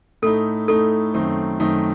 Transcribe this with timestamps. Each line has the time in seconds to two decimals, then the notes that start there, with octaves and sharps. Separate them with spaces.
0.22 A2 A3 D#4 A4
0.68 A2 A3 D#4 A4
1.14 F#2 D#3 A3 C4 D#4
1.60 F#2 D#3 A3 C4 D#4